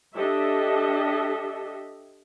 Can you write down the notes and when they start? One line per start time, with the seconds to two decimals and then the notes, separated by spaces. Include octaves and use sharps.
0.14 D4 G4 A4 D#5 E5